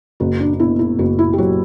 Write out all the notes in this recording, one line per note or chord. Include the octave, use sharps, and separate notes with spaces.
F#1 F#4
D4
D4
B2 E4
E4
F#1 F#4
E4
G4
F#3 F#4